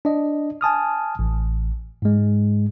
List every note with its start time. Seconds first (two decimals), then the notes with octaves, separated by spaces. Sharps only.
0.05 D4 D#5
0.61 G#5 A5 D#6 F6
1.19 A1
2.02 G#2 G#3